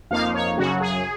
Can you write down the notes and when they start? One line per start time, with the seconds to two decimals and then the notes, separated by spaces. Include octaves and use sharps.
0.11 F2 F3 A#3 D#4 F5
0.34 C#5
0.57 F#2 C#3 F#3 F#4
0.81 G#4